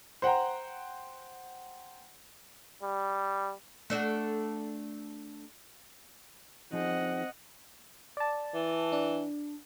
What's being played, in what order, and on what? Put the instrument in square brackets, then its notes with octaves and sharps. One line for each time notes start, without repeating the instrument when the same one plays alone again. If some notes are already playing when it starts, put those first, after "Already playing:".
[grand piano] C5 F#5 G5 A#5
[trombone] G3
[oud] A3 D4 F#4
[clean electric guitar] F3 D#4 G#4 [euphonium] C4 [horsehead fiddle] D#5 F#5
[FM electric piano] D5 A5
[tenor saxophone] E3
[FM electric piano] D4